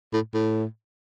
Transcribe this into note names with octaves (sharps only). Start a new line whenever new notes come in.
A2
A2